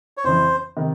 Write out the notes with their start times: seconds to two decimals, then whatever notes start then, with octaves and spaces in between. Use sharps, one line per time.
0.17 C#5
0.24 F2 C#3 E3 C5
0.77 C3 D#3